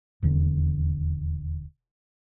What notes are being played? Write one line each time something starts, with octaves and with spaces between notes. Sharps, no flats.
D#1 E2 D3